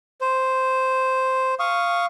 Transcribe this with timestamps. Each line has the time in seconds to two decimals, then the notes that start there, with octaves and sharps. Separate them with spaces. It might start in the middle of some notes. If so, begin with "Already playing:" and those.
0.21 C5
1.59 F5 C#6 D#6